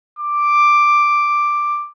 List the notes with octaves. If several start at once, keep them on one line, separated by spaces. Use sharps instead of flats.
D6